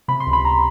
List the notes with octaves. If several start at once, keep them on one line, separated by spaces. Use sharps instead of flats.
C3 B5
C6
C#2
B5
C#2 A#5